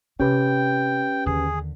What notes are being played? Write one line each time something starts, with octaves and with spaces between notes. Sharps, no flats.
C3 C#4 G4 B4 G5
D#2 D3 G#4